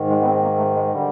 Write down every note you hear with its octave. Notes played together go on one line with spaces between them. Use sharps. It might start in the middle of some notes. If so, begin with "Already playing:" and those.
Already playing: G#2 D#3
G#3
B3
C4
A#3
A3
G#3
D3 G3